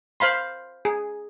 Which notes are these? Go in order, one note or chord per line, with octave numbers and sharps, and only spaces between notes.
C5 F5 B5 C6
G#4